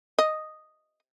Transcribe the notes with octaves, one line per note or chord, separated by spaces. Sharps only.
D#5